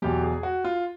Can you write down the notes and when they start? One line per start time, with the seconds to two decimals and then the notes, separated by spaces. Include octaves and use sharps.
0.02 E2 B2 F#3 G4
0.23 G#4
0.43 F#4
0.64 F4